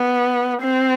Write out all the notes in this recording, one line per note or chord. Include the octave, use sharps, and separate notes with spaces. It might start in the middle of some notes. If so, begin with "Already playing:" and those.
Already playing: B3
C4